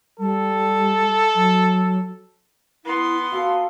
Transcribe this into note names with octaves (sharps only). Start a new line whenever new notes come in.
G3 A4
F#3
B3 E4 C6
F4 F#4 A4 A#4